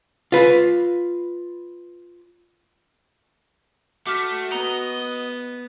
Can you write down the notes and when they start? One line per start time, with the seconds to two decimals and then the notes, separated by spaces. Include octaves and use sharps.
0.32 F4 B4
4.07 A3 F#4 D6 F6 B6
4.52 B3 D#5 A#5